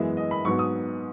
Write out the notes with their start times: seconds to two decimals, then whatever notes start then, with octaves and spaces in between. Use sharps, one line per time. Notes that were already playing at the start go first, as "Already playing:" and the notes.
Already playing: F#2 E3 G#3 B3 E5
0.17 D#5
0.31 B5
0.45 G#2 F#3 B3 C#6
0.59 D#6